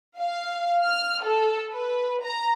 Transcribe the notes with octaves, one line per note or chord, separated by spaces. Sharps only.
F5
F6
A4
B4
A#5